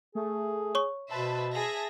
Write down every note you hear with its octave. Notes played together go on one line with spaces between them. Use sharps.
A3 G#4
C#5 C#6
B2 B4 C5 E5 A5
G#4 E5 A#6